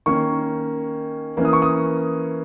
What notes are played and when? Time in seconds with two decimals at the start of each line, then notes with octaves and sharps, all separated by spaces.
0.06 D#3 A#3 C#4 C#6
1.37 E3 A#3 C#4
1.45 D#6
1.53 C#6
1.62 D#6